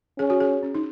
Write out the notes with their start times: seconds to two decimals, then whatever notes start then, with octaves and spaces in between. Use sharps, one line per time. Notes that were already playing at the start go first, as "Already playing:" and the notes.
0.18 C#4 G#4
0.30 F#4
0.40 G#4
0.63 C#4
0.74 D#4